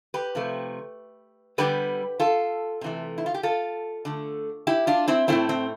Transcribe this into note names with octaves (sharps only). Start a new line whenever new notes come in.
G4 B4
C3 F3 A3
D3 G3 B3 G4 B4
F4 A4
C3 E3 A3
E4
F4
G4
F4 A4
D3 A3
E4 G4
D4 F4
C4 E4
A2 F3 A3 C4 E4
C4